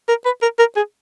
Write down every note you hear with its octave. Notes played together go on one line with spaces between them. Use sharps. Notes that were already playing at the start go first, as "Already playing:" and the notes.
A#4
B4
A#4
A#4
G#4